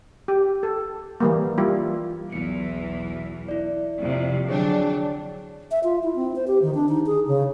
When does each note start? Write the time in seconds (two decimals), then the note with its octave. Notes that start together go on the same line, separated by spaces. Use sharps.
0.28 G4
0.63 A4
1.20 E3 G3 A#3
1.58 G3 E4 F4
2.32 B1 E2 E3 C#7
3.48 E4 D5
4.01 F2 C3
4.49 D3 F#3 D4 G#4 C#5 G5
5.71 E5
5.84 F4
6.03 E4
6.16 C4
6.36 C5
6.47 G4
6.62 D#3
6.74 D4
6.89 D#4
7.06 G#4
7.27 C#3